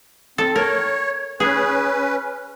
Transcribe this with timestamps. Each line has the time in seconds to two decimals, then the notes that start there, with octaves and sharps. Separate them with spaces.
0.38 C4 A4
0.56 A#4 C#5
1.40 C#4 G#4 B4